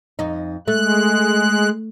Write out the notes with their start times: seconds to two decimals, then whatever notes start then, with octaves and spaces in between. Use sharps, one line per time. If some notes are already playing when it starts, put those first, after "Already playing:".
0.19 F2 D#4
0.68 G#3 A3 F#6